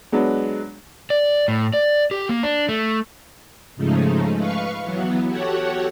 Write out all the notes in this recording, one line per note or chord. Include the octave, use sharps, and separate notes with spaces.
F#3 G#3 B3 D4
D5
A2
D5
G4
A#3
D4
A3
G#2 C#3 F3 G#3 A3 D#4
B4 F5 C#6
E3 F#3 B3
F#4 G4 A4 C#5 F#5